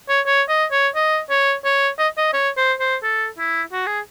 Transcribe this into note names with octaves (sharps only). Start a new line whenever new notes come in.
C#5
C#5
D#5
C#5
D#5
C#5
C#5
D#5
D#5
C#5
C5
C5
A4
E4
F#4
G#4